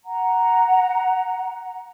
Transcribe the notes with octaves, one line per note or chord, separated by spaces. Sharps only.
F#5 A#5